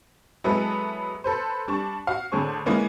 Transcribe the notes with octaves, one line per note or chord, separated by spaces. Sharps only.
F#3 G#3 B3 E4 A4 B4
A4 B4 C5
G3 D4 A5 C#6
F#4 F5
A1 D3 D4 G#4 C5 C#6
E3 G#3 A#3 B3 C#4